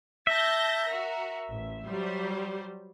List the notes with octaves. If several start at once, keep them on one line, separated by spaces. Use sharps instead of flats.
E5 A5 G6 A#6
F#4 A#4
A1
F#3 G3 C5